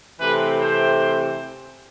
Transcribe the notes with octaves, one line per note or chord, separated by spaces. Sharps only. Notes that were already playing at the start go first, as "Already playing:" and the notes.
C3 E3 A3 C4 B4
C5